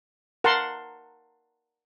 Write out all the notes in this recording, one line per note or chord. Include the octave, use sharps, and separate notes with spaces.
A#4 F#5 A5 C6